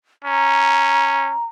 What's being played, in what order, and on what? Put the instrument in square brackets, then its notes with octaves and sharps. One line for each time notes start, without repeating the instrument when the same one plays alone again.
[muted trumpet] C#4 [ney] A#5